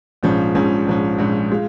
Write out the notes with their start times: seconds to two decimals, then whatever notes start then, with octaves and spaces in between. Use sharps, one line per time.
0.23 A#1 G#2 F3 C#4
0.55 A#1 G#2 F3 C#4
0.86 A#1 G#2 F3 C#4
1.18 A#1 G#2 F3 C#4
1.51 G#3 F4